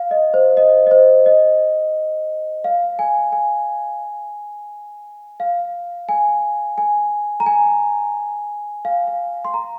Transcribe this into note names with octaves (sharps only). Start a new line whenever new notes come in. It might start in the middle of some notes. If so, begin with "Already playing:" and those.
Already playing: F5
D#5
C5
D#5
D#5
C5
D#5
F5
G#5
G#5
F5
G#5
G#5
A#5
G#5
F5
F5
C6
A#5